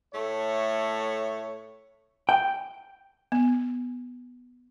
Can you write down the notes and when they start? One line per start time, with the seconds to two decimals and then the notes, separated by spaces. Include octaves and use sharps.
0.14 A2 A3 C#5
2.29 G5
3.32 B3